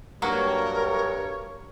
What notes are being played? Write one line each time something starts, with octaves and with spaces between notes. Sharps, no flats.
G2 F#3 A#3 F#4 A#4 C#5